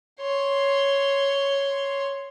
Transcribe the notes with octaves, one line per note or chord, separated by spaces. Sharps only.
C#5 C6